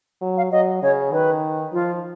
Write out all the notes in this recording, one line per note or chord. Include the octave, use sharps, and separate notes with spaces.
F#3
F5
F#3 D#5
C#3 C#5
D#3 B4
F3 F4